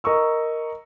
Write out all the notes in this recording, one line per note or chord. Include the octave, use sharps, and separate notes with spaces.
A#4 D#5 C#6 E6